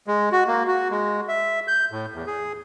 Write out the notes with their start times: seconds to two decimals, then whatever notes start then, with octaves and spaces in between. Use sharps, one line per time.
0.07 G#3
0.32 F#4
0.47 A#3
0.67 F#4
0.91 G#3
1.28 E5
1.68 G6
1.91 A2
2.14 E2
2.27 G#4